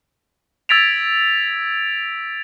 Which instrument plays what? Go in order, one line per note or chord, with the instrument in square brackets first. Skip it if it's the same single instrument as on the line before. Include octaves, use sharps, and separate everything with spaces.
[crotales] E6 G#6 A6 B6 D7 F7